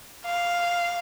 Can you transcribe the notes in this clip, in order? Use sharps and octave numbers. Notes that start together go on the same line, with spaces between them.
F5